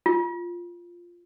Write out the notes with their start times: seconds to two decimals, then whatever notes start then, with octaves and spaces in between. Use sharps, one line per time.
0.06 F4